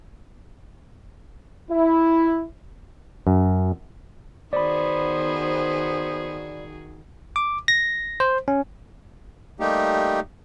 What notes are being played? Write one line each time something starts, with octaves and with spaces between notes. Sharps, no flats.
E4
F#2
D#3 B3 F#4 G#4 C5 D5 B5
D6
A#6
C5
C#4
G3 A3 A#3 D#4 G4